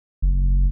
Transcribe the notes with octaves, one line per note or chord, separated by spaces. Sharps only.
F#1